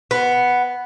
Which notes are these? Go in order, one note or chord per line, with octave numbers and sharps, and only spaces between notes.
B3